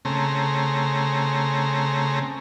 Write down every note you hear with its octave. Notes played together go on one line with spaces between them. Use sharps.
C#3 A3 C4 A#5